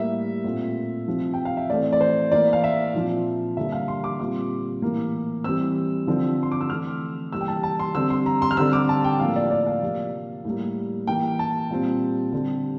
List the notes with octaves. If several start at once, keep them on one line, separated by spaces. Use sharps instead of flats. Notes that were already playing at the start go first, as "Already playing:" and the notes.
Already playing: A2 G3 A#3 E5
A#2 A3 C4
C3 F3 C4
G5
F5
E5
A2 E3 A3 C4 D5
D5
C5
E3 A#3 D5
F5
E5
A#2 F3 C4
D3 G3 A#3 E5
F5
C6
D6
A#2 G3 C4 D6
A2 E3 A#3
E3 G3 C4 E6
D3 F3 C4
C6
D6
E6
E3 A3 C4 F6
C3 E3 G3 A#3 E6
G5
A5
A5
C6
D3 G3 C4 E6
C6
A#5
C6
F6
D3 G3 C4 E6
D6
A5
G5
A2 F3 A#3 F5
D5
D5
F5
C3 F3 A#3
A2 G3 A#3
E3 A#3 G5
A5
A#2 G3 C4
D3 G3 C4